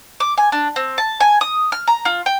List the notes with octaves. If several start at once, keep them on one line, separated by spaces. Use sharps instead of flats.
D6
G#5
D4
C4
A5
G#5
D#6
F6
A#5
F4
G5